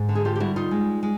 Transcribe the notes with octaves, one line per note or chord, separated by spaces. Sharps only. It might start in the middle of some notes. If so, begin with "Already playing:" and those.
Already playing: G#2
D3
G#4
F4 G4
G4
G3 E4 F#4
D#4 F4
G#3
G#3